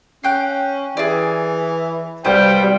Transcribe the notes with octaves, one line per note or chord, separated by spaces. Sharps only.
C#4 F5 G5 F#6
E3 G#4 D5
C2 G3 B4 C5 F5 G5